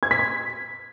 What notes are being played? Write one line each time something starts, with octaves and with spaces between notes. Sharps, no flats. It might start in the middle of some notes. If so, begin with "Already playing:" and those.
G#6
B6
G#6